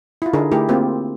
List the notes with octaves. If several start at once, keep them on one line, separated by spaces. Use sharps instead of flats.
E4 F4
D3 D4 D#4 G#4 A#4
A3 E4 G4 G#4 A#4
A#3 C4 F4 G4